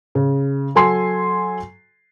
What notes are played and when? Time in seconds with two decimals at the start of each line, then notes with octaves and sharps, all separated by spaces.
0.15 C#3
0.75 F#3 A4 G#5 C6 C7